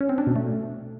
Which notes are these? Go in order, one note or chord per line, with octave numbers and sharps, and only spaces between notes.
C#4
C4
D4
B2
A3